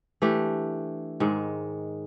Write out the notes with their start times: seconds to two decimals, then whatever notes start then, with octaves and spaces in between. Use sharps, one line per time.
0.22 E3 A3 D4 G4
1.20 G#2 D#3 G#3